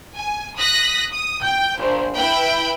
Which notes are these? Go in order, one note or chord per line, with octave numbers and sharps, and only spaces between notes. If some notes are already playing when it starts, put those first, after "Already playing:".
G#5
D#6 F#6 A#6 B6
D#6
G5 G6
A#1 C5
E4 B4 G5 B5